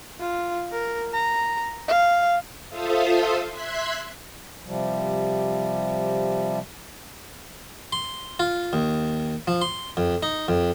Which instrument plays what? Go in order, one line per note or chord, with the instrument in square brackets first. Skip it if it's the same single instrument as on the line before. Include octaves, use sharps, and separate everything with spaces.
[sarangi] F4
A#4
A#5
F5
[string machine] F4 A4 C5 E5 F5 D#6
E5 C6 F#6 G#6 B6
[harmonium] C3 F3 G3
[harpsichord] C6
F4
D#2
F3
C6
F2
D#4
F2